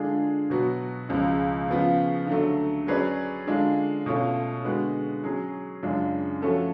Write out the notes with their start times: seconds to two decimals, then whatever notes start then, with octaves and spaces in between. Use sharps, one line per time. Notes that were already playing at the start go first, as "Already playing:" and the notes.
Already playing: D3 G#3 D4 F4 G#4
0.50 B2 F#3 B3 F#4
1.09 C#2 C#3 F3
1.68 C#3 F3 B3 F4
2.27 D3 F#3 A3
2.87 F#3 C#4 G#4 B4 D5
3.47 D3 G#3 D4 F4
4.06 B2 A3 C#4 F4
4.64 D3 G#3 B3 F#4
5.24 F#3 C#4 G#4
5.83 F#2 C#3 G#3 D4 F4
6.42 F3 A3 C#4 F#4 A4